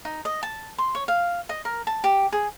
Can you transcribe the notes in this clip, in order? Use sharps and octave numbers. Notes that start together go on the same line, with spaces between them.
D#4
D#5
A5
C6
C#5
F5
D#5
A#4
A5
G4
G#4